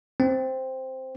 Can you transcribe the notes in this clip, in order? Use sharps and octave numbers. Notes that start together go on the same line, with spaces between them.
C4